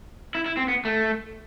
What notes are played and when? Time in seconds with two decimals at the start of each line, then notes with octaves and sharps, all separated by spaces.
0.35 E4
0.46 E4
0.57 C4
0.68 B3
0.85 A3